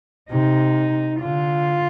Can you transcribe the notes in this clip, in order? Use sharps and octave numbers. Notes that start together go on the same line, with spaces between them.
C3 D#4
D3 F4